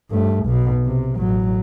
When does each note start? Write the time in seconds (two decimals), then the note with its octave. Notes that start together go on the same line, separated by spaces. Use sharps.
0.10 G2 A3
0.45 B1 B2
0.85 C3
1.16 A1 F#3